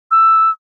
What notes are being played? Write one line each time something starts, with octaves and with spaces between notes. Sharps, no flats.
E6